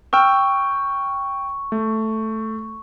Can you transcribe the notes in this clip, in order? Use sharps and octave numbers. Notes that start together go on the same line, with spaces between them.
G5 C#6 E6 F6
A3